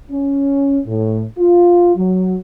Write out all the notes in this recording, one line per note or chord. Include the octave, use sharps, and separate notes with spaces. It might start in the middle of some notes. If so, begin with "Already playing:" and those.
C#4
A2
F4
F#3